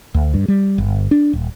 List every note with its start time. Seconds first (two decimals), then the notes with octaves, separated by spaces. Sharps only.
0.14 D2
0.34 G2
0.48 G3
0.78 G1
1.11 D4
1.33 D#1